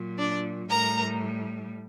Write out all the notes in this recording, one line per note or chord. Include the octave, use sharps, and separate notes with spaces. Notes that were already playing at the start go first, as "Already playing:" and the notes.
Already playing: A#2 F#3
D4 D5
A2 G3 A#4 A#5